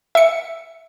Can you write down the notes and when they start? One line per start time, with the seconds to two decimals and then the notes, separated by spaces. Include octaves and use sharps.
0.15 E5 C#7